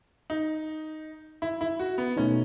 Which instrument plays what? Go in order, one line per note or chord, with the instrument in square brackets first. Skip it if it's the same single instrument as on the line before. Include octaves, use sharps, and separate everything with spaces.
[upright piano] D#4
E4
E4
F#4
B3
[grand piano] B2 A3 D#4 [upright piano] C#4